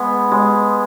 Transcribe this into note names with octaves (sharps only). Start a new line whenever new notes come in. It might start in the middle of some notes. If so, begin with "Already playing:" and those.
Already playing: G#3 B3
G#3